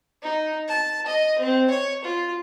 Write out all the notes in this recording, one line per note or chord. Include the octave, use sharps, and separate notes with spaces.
D#4
A5
D#5
C4
C#5
F4